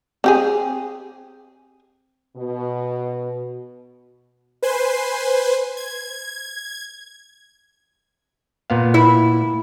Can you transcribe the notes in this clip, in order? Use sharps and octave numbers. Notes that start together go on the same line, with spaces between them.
C4 G4 G#4
B2
B4 C5 G#5 C6
G#6
A#2 B3 F5
E4